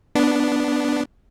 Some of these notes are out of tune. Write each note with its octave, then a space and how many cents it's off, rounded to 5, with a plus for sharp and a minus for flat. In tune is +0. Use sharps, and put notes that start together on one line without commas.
B3 +0 D4 +0